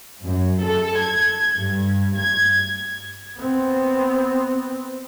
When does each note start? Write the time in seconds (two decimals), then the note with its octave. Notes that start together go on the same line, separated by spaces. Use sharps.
0.22 F#2
0.63 A4
0.98 G#6
1.59 G2
2.18 G#6
3.38 B3 C4